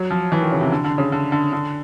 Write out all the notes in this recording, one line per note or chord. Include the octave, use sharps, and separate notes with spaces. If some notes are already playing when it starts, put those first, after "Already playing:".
Already playing: F#3
F3
E3
D#3
C#3
C3
D3
D3
C#3
D3
D3
D3